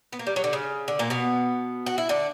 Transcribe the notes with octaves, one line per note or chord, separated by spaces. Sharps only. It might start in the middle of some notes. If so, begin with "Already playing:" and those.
B3
A#3
G3
F#3
D3
C#3
D3
A#2 A#3
B2 B3
F#4
E4
D3 D4